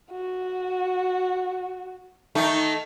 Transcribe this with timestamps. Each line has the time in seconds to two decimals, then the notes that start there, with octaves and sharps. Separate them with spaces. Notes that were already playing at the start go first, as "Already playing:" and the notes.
0.12 F#4
2.35 D#3 A3 D#4